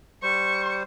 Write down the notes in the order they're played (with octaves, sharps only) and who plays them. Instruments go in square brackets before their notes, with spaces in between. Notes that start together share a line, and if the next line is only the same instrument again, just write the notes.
[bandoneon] G3 C5 [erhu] C#6